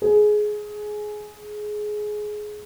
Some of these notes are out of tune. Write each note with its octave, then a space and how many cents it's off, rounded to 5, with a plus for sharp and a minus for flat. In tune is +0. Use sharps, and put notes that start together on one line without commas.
G#4 +15